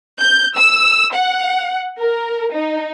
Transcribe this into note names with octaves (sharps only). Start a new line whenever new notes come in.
G6
E6
F#5
A#4
D#4